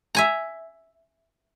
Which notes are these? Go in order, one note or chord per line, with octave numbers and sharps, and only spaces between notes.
E5 G#5 A#5